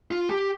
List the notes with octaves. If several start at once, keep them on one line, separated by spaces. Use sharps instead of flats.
F4
G4